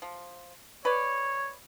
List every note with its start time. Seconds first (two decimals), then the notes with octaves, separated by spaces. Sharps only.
0.02 F3
0.85 B4 C#5 D5